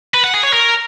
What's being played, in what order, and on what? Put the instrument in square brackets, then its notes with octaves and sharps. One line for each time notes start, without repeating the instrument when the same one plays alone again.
[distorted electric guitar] B4
F#5
G#4
C#5
A#4